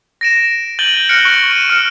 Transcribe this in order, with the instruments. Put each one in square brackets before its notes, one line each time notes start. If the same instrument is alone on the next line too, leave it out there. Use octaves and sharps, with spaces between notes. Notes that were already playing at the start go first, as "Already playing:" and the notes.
[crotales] A#6 D7 E7
G6 A6 D#7 F#7 G7
F6 F#6 A#6 C#7 D7
C#6
D#7 E7
F6 C#7